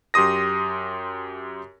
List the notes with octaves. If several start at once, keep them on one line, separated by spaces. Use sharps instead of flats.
F#2 G4 C6 D#6 A#6